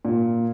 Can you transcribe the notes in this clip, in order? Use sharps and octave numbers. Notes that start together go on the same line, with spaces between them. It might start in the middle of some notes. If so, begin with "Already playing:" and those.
A#2